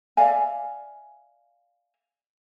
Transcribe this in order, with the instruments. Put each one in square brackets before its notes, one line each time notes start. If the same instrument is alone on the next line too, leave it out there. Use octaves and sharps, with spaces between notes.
[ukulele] D5 E5 F5 G#5